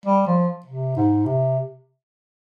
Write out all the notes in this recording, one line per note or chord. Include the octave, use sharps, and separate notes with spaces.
G3
F3
C3
G#2
C3